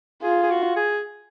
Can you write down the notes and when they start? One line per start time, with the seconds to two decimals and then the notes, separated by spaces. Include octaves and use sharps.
0.23 F4 G#4
0.43 G#4
0.50 F#4
0.76 G#4